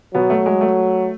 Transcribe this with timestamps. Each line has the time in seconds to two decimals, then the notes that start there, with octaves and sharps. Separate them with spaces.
0.14 B2 F#3 B3
0.30 A3
0.46 G#3
0.61 A3